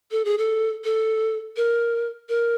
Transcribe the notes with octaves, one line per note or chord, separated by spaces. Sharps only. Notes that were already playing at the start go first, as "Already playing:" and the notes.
A4
G#4
A4
A4
A#4
A#4